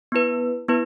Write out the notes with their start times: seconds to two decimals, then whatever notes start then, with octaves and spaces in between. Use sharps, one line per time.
0.12 B3 E4 B4
0.68 B3 E4 B4